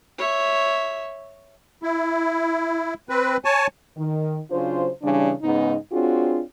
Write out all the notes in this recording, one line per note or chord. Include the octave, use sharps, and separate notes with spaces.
C#5 E5
E4
C4 B4
C#5 G#5 A5
D#3
C#3 F#3 D4 F4 C5
C#3 E3 G3 D4
G#2 C#3 B3 D#4
C4 D4 F4 F#4 G#4 C#5